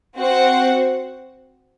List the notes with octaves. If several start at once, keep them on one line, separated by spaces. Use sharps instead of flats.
C4 F#4 C5 F#5